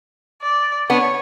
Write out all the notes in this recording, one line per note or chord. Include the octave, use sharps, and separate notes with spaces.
D5
B3 D4 C#5